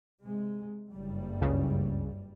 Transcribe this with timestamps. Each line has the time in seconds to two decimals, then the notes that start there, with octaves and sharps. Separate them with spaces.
0.24 C3 G#3
0.92 F#1 G2 G3
1.41 C#2 C#3